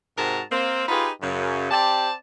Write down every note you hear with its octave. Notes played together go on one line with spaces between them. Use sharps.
G#2 C3 F#4 A#4 A5 A#5
A#3 C4
D#4 F4 G4 G#4 B4
F#2 C#3
C4 G4 C5 D5 A5